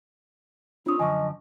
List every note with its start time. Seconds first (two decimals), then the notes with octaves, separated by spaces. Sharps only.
0.86 C4 D4 F4 C#5 D#6
0.99 F#2 D3 F3 D#5 G#5 C#6